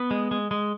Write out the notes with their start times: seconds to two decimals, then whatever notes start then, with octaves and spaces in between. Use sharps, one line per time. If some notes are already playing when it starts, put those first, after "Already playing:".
Already playing: B3
0.11 G#3
0.31 G#3
0.51 G#3